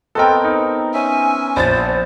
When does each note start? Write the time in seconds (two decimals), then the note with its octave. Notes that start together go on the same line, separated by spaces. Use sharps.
0.15 B3 C4 A4 A#4 D#5 G5
0.44 D#4
0.94 C#4 E5 G#5
1.57 A#1 C5 A6